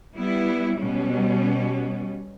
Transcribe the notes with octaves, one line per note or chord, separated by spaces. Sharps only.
G3 B3 E4
B2 G3 C#4